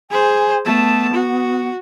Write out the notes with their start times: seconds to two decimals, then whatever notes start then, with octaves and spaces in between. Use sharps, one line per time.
0.11 G#4 C5 G#5
0.66 A3 B3 A5
1.13 F#4